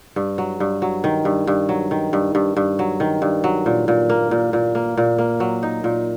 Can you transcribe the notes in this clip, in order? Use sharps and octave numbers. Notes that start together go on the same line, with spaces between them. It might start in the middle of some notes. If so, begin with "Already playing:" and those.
G2
F#3
G2
F#3
D#3
G2
G2
F#3
D#3
G2
G2
G2
F#3
D#3
G2
F#3
A#2
A#2
A#3
A#2
A#2
A#3
A#2
A#3
F#3
D#4
A#2